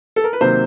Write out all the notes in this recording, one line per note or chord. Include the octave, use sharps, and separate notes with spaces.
A4
A#4
B4
C3 D#3 F#3 A#3 C5